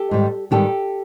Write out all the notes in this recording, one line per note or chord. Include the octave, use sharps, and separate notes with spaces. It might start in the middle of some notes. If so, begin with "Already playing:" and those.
Already playing: G4 A4
G#2 D#3 G3
G#2 D#3 G3 G4 A4